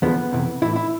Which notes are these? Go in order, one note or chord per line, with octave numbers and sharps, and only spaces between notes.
E2 D3 F3 B3
F2 C3 E3
A2 E3 E4
E4